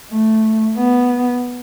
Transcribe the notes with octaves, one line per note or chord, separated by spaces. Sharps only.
A3
B3